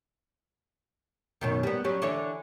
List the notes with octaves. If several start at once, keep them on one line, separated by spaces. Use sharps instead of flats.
F#2 B2 D#3
G3 B3
F#3 G3 C#4
D3 E3 C#5